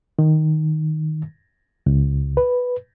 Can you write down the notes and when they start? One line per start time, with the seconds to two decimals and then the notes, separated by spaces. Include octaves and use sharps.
0.19 D#3
1.86 C#2
2.37 B4